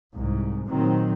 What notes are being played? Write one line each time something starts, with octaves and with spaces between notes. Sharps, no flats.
C2 G#2
A#2 D#3 F#3 C4